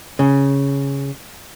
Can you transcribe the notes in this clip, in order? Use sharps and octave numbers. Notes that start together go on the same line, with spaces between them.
C#3